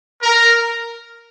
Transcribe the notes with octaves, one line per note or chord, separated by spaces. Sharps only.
A#4